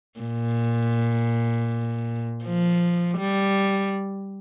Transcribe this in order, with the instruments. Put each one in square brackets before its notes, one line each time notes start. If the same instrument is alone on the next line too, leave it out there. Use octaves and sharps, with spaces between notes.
[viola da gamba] A#2
F3
G3